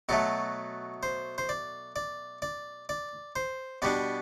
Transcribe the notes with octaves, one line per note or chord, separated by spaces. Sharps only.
B2 F#3 A3 A4
C5
C5
D5
D5
D5
D5
C5
B2 G3 B3 D4 D5